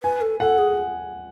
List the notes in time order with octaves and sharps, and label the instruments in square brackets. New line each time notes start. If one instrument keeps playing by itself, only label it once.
[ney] B4 [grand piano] G#5
[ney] A4
[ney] A4 [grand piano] F#5
[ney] G#4